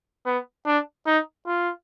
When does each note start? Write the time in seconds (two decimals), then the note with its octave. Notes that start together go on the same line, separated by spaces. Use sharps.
0.26 B3
0.66 D4
1.06 D#4
1.46 F4